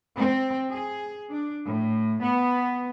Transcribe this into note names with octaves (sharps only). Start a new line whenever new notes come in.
C4
G#4
D4
A2
B3